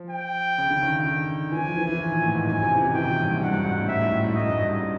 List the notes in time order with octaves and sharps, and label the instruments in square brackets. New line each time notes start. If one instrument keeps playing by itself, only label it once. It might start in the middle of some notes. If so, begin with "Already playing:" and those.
Already playing: [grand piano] F3
[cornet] G5
[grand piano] C#3
D3
D#3
D3
D#3
[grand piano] E3 [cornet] G#5
[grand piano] F3
E3
E3
D#3
A#2
A2
G#2
[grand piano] F#2 [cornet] G#5
[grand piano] C3
E3
D#3
[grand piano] E3 [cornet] G5
[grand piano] A#2
G2
G#2
[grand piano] G2 [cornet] F#5
[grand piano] F#2
G#2
A2
[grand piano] G#2 [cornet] E5
[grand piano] A2
A2
A2
[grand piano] G#2 [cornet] D#5
[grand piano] F#2
G2
G#2